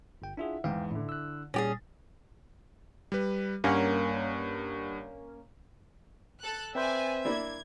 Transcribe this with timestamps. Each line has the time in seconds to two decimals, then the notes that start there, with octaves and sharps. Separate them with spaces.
0.22 G1 G5
0.37 D4 E4 F4 G#4 E5 F#5
0.64 E2 G#2 F5 G5
0.91 A2 D3 E4
1.09 E6 F#6
1.54 A#2 G3 C#4 G4 G#4 A6 A#6
3.12 G3 B4
3.64 G2 A#3 C#4 A#4 F#5
6.40 A4 F#6
6.75 C4 B4 C5 D5 E5 G#5
7.25 A#3 D4 E4 G#6